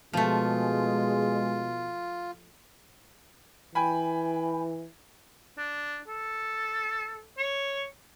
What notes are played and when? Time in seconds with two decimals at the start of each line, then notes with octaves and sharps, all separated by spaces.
0.13 B2 F3 G#3 A3 F4
3.75 E3 G5 G#5 B5
5.58 D4
6.08 A4
7.37 C#5